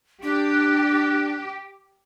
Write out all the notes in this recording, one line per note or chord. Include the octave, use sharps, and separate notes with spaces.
D4 G4